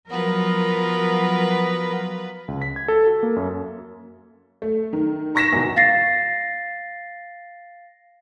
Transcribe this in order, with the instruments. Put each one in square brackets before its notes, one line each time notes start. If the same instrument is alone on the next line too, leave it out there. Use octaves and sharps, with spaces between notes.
[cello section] F3 F#3 A#4 [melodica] B3 [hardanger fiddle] F4 B4
[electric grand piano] C#2
B6
G#6
A4
F#4
A#3
F#2
[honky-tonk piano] A3
D#3
A#5 C#6 A#6 B6 E7
G#1 E2 B2 D#3
[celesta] F5 A6 A#6 C7